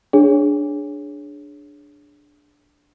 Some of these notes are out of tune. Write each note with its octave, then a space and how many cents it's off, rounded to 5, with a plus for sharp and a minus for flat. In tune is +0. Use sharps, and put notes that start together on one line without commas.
D4 +0 G#4 +0 C#5 -10